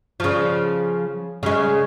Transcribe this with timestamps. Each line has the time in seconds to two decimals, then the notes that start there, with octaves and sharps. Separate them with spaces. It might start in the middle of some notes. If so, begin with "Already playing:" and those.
0.20 C#3 F3
1.43 C#3 G#3